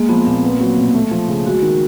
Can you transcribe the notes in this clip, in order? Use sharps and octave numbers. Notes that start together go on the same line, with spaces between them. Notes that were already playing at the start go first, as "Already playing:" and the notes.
Already playing: G#3 A#3
F3 B3
A#2 C4
B3
F#3
B2
A3
F3
C#3
G#3 F#4
D#3